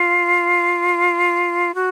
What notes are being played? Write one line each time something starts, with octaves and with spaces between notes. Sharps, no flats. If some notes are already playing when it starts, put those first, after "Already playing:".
Already playing: F4
F#4